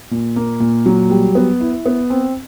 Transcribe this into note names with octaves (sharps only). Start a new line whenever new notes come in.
A#2
A#3
A#2
F#3
G3
B3
E4
B3
C4